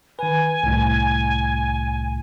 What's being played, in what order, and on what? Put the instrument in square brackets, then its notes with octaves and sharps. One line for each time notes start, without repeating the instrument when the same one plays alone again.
[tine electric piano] D#3 B4 [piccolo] G#5
[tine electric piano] C2 A2